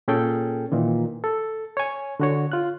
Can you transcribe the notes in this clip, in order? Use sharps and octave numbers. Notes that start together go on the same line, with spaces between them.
A#2 C#4 G#4 A4 G5
A#2 D#3 E3
A4
C#5 G#5
D3 F#4 C#5
F4 F#6